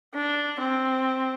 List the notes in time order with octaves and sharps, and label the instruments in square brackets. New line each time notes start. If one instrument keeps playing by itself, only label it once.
[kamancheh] D4
C4